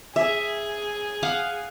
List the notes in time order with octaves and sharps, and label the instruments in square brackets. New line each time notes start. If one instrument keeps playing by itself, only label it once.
[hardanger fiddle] G#4 [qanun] E5
[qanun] F5 F#5